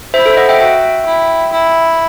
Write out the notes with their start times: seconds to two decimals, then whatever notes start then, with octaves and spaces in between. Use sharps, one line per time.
0.14 E4 C5 E5
0.25 A4 C5
0.37 D#5 F#5
0.49 E5 G5
0.60 F#4 E5 G5
1.06 E4
1.52 E4